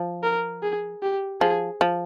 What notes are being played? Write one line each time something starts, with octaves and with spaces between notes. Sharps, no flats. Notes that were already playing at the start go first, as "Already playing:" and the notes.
Already playing: F3
A#4
G#4
G4
F3 G#4
F3